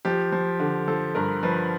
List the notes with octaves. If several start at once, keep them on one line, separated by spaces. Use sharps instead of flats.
F3 G4
F3
D3
F3 A4
G2 A#4
F3 B4